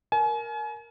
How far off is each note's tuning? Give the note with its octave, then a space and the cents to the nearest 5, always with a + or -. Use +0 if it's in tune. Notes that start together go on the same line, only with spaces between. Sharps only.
A#4 +0 G#5 +40